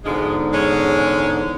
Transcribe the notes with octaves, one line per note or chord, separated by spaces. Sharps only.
E2 G#2 B2 D3 F3 G#3
G#3 C#4